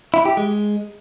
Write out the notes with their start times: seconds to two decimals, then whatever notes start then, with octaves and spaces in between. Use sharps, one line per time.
0.14 E4
0.25 G4
0.37 G#3